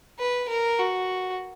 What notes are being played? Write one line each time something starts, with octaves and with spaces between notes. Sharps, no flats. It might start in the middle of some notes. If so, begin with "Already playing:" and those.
B4
A#4
F#4